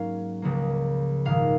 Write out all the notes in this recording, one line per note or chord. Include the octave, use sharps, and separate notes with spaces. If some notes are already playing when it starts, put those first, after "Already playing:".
Already playing: G#2 F#3 A#3 C#4 F5
C#2 C#3 F3 A#3
A#1 G#2 D#3 G#3 F5